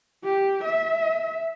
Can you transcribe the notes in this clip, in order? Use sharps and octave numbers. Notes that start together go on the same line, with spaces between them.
G4
E5